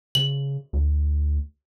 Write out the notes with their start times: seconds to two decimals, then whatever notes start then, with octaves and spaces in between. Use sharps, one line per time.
0.15 C#3 F#7
0.73 D2